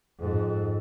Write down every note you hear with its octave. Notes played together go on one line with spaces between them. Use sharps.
F2 G#2